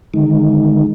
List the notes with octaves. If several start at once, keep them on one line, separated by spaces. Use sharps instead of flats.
D3 D#3 G#3 D#4